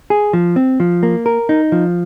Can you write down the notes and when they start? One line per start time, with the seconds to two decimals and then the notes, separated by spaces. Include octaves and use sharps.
0.10 G#4
0.33 F3
0.56 C4
0.80 F3
1.03 A#3
1.26 A#4
1.49 D#4
1.72 F3